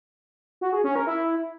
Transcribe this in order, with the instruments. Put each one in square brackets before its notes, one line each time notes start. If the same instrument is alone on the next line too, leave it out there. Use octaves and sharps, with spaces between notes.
[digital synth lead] F#4
G#4
C#4
A#4
E4